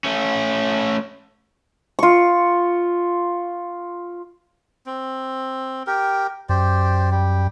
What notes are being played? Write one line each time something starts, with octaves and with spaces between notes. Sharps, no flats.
A3 C#4
F4 C#6
C4
G4 A#4
F#2 G4 C5 D5
G3 G4